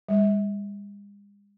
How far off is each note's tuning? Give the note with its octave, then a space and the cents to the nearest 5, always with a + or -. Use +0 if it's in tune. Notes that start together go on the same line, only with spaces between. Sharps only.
G#3 -45